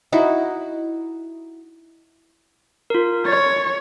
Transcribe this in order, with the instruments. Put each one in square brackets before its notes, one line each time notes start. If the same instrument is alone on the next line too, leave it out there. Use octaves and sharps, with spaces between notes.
[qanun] D#4 E4 F#4
[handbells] F4 A#4
[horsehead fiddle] C#5 [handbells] A6